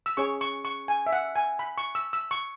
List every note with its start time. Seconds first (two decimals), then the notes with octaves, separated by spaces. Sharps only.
0.06 E6
0.17 C#4 G#4 C#5 C#6
0.41 C#6
0.65 C#6
0.88 G#5
1.06 E5
1.13 F#5
1.36 G#5
1.59 B5
1.78 C#6
1.95 E6
2.13 E6
2.31 C#6